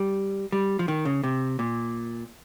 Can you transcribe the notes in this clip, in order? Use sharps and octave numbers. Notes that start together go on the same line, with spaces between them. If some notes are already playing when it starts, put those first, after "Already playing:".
Already playing: G3
G3
F3
D#3
C#3
C3
A#2